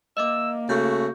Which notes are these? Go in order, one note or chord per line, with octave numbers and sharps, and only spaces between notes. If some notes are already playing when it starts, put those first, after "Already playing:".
A#3 D#5 E5 D6 E6
C#3 A3 F#4 G6